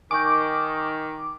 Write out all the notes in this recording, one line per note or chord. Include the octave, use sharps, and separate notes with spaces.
D#3 G#5 C#6 D6 G6